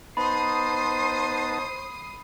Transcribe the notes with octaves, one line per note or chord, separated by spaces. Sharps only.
B3 D#4 C5 A5 B5 D#6 C7